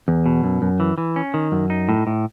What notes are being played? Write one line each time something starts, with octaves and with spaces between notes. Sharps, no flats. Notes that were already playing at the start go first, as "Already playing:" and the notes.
E2
B2
F#2
F#2
E3
E3
C#4
D#3
F#2
D#4
A2
A2